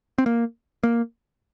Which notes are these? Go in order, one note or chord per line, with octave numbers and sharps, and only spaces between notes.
C4
A#3
A#3